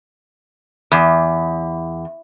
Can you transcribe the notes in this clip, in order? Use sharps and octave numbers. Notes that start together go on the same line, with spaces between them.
E2